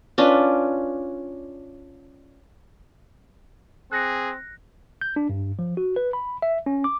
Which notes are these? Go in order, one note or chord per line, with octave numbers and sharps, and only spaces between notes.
C#4 D4 F4 B4
C4 G#4 F#6 A#6 C#7
G6
D4
G2
F3
F#4
B4
B5
E5
C#4
D6